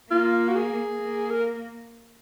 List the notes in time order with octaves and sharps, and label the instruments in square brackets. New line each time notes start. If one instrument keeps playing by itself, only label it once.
[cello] A#3 [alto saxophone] F4
[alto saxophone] F#4
G#4
[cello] A#3
[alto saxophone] A#4